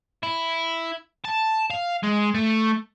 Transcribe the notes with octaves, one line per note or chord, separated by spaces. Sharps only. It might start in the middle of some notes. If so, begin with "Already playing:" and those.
E4
A5
F5
G#3
A3